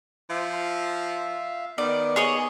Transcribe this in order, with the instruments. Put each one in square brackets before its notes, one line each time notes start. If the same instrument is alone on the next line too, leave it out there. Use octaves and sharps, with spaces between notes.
[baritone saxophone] F3 [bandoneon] E5 F5
[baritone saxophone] D#3 [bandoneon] B3 [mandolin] D5
[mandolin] G#4 C#5 D#5